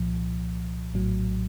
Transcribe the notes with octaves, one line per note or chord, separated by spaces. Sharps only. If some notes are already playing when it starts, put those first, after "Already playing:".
Already playing: C2 A#2 F3
A#1 A2 F#3